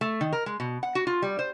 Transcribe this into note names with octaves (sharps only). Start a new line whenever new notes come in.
A3
D#3
A#4
G#3
B2
F#5
F#4
F4
G3
C5